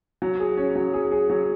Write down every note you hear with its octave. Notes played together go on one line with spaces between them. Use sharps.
F#3
G#4
C#4
F#3
G#4
G#4
F#3